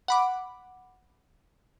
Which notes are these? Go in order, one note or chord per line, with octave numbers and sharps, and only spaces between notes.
F#5 B5 D6